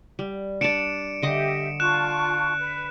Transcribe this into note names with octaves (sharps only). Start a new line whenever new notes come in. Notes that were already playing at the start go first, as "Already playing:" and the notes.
G3
D4 D5 C#7 D7 E7
D3 G4 D#5 E5 D6
F4 A5 C#6 F#6 E7
B4